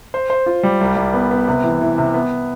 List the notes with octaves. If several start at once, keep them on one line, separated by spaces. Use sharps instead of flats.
C5
C5
F4
G3
C2
C2
B3
B3
C3
E3
E3
C3
B3